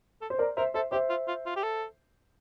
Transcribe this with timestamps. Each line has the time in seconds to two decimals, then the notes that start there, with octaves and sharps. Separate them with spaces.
0.22 A4
0.30 C5
0.39 A#4 D5
0.57 A#4 C5 E5
0.74 A4 C5 E5
0.92 G4 C5 E5
1.10 F4
1.28 F4
1.46 F4
1.56 G4
1.63 A4